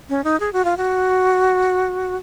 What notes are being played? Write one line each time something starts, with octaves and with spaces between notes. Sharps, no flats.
C#4
D#4
G#4
F#4
F4
F#4